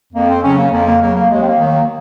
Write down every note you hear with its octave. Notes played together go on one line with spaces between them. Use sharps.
F2 A#3
C4
C#3 F#3 C#4
A#3
F2 A#3
A#3
C#3 F#3 A#3
A#3
D#2 G#3
C4
A#3
D#3 F#3
A#3